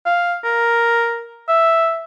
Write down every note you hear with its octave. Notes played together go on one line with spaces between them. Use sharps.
F5
A#4
E5